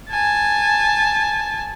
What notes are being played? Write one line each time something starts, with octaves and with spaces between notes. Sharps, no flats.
G#5 A5